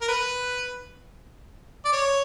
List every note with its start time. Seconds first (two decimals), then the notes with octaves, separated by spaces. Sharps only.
0.01 A#4
0.08 B4
1.85 D5
1.92 C#5